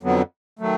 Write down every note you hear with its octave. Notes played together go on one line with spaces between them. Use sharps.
F2 D3 F#3 B3
D#3 F#3 A3